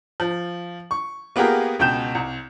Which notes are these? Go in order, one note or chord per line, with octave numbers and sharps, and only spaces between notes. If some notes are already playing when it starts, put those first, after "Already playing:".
F3
C#6
A#3 B3 F4 G4 G#4 A#4
C#2 B2 G5 G6 E7
C2